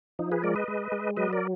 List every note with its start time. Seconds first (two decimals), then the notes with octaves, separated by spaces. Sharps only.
0.19 F3 D#4
0.32 G#4 B4
0.43 G#3 A#4 D5
0.56 B4 D#5
0.68 G#3
0.92 G#3
1.17 F#3 B4 D#5
1.33 A#4 D5